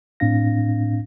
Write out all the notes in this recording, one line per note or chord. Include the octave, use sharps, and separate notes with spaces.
A2 C4 D4 F5 A#6